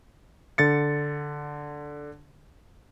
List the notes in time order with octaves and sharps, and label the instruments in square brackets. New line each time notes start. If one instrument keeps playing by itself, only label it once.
[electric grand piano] D3 A6 C#7